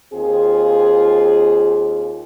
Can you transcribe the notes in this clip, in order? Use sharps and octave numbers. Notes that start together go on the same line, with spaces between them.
D#2 C4 F4 G#4